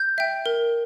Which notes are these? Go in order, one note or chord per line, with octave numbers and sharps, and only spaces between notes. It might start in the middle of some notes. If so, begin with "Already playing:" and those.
Already playing: G6
E5 G5
A#4